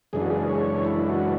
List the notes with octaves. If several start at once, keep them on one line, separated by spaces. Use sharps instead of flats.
F#2 C#3 E3 G#3 D4 G#4
F#4
G#4
C#5
E4
F#4